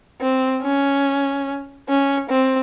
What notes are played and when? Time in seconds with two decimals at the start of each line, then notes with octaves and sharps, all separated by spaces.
0.20 C4
0.62 C#4
1.88 C#4
2.29 C4